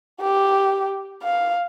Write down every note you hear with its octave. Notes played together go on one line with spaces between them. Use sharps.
G4
F5